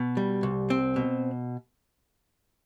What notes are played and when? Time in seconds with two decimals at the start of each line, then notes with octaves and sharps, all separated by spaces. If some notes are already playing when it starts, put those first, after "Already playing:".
Already playing: B2
0.17 G3
0.43 C2
0.70 C4
0.96 B2